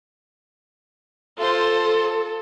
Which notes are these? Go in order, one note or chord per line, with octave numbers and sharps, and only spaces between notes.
F4 A4 C5